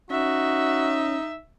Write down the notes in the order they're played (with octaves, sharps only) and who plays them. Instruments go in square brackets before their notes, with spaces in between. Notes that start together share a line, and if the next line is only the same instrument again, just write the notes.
[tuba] C#4 [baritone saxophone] D#4 [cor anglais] F#4 [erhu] E5